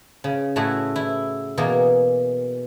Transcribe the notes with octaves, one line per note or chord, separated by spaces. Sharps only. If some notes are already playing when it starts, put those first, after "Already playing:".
C#3
A2 A3 E4 F#4 G#4
E4
B2 E3 A#3 G#4 A#4